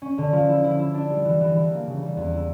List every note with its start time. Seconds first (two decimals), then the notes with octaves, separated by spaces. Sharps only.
0.02 C#4
0.18 D3
0.32 F3
0.49 E4
0.64 E4
0.79 E4
0.94 D4
1.10 G3
1.25 E3
1.41 E3
1.56 E3
1.71 A#3
1.87 C#3
2.02 G3
2.17 E2
2.33 E4